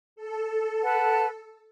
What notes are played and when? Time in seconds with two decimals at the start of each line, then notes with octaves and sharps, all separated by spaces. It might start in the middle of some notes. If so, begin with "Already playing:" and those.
0.16 A4
0.81 B4 F#5 A5